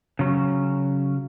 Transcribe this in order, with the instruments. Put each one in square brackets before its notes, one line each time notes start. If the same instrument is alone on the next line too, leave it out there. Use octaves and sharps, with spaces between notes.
[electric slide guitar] C#3 F#3 C#4